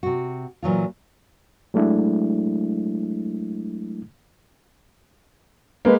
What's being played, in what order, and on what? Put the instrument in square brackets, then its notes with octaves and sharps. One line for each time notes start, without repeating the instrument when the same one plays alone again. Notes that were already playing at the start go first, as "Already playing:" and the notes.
[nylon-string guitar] C3 F#4
A#2 E3 F#3 F4
[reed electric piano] F#3 G#3 A3 D4 E4
[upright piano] G#3 A#3 [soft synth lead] B4